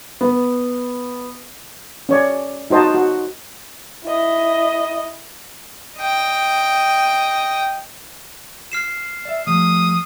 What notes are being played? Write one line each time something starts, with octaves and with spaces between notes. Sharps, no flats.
B3
C#4 C#5 D5
D#4 F#4 C5 D#5 A5
F#4
E4 D#5
D#5 G5
F6 C7 E7
D5 E5
F3 G3 A3 D#6